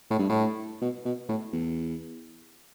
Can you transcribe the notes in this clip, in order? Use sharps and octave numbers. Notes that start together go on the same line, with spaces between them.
A2
G2
A2
B2
B2
A2
E2